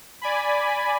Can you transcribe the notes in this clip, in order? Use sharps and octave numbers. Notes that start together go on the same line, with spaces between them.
D5 G#5 B5